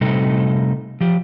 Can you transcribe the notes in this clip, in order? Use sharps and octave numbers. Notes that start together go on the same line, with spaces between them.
C3 G3 A3 D#4 A4
F3 G4